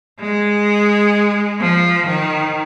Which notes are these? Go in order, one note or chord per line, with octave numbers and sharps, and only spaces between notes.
G#3
F3
D#3